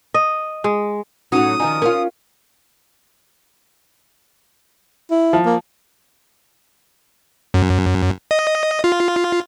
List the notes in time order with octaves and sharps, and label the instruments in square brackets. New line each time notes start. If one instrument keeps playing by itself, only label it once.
[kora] D#5
G#3
[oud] A2 F#3 [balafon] C#4 D#4 F#4 [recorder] D#6
[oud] D#3 F3 D#4 [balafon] G#5
[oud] C#4 D4 F4 [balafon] A#4
[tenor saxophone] E4
[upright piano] F3
[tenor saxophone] A#3
[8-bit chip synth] F#2
D#5
F4